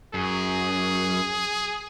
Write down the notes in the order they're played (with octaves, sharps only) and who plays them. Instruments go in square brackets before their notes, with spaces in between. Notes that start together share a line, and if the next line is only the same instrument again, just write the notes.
[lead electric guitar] F#2 [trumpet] G#4